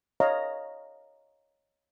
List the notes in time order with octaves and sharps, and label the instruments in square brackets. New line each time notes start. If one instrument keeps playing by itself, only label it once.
[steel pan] C#5 D#5 F5 A#5